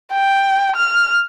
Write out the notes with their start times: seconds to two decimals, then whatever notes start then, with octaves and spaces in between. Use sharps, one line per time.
0.12 G5
0.76 F6